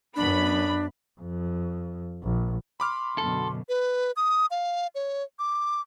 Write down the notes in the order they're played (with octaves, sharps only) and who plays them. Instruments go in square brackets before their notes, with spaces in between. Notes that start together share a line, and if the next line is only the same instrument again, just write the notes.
[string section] F#2 B3 B5 [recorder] D4
[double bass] F2
A#1
[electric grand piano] B5 D6 F6 [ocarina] C6
[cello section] F#2 B2 D3 [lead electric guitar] A4
[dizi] B4
D#6
F5
C#5
D6